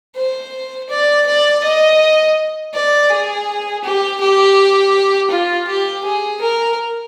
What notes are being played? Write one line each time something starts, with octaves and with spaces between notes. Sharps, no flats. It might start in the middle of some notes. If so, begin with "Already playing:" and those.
C5
D5
D5
D#5
D5
G#4
G4
G4
F4
G4
G#4
A#4